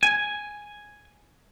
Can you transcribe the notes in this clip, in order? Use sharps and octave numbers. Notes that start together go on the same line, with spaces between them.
G#5